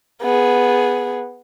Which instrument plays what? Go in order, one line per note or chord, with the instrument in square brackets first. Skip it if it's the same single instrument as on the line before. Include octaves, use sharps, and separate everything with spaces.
[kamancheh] B3 G#4